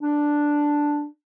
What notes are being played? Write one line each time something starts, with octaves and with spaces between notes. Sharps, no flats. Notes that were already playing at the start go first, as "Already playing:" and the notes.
D4